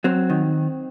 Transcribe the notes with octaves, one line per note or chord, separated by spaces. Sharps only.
F#3 C4
D#3